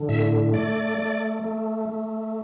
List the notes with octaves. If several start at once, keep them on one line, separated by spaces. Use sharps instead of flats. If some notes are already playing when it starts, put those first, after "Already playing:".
Already playing: D3
A2 E5
A3 D5
A3
A3
A3